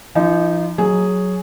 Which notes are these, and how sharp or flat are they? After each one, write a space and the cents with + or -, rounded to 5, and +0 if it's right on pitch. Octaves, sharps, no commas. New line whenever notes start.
F3 -40 D#4 +0
F#3 +0 G#4 +0